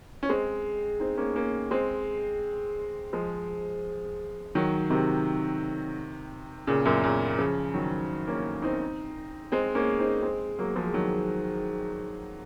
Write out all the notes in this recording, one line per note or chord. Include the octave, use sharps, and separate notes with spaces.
C#4
G#3 C4
C4 D#4
A#3 C#4
A#3 C#4
G#3 C4
F3 G#3
D#3 F#3
C3 D#3
A#2 C#3
F#2 A#2
A#2 C#3
C#3 F3
D#3 F#3
A#3 C#4
C4 D#4
G#3 C4
A#3 C#4
C4 D#4
G#3 C4
F#3 A#3
F3 G#3
D#3 F#3